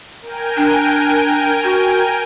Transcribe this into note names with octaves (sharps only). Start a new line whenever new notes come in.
A#4 G5 G#5
D4
F#4